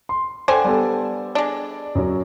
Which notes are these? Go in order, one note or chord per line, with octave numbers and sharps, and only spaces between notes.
C6
D3 A4 C5 G5 G#5 D6
G3 B3 A4
G#3 D4
F#2 F#3